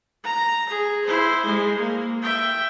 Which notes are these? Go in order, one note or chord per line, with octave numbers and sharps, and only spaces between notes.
A#5
G#4
E4 C5
G#3
A#3
E5 G5